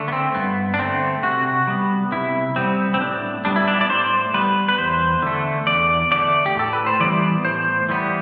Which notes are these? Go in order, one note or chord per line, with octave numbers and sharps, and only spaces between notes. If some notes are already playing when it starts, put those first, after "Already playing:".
Already playing: D3 A3
B3
C4
G2 B3
D4
D3 A3 C4
C3 F#4
G3 B3
C3 E4
G3 B3 C4
C4
A2 D4
G3 B3 D4
E4
D4
D5
A2 C5
G3 B3 B4
B4
E2 C5
D3 A3
E2 D5
D3 A3 D5
G4
A2 A4
B4
C5
E3 G3 B3 D5
A2 C5
E3 G3 B3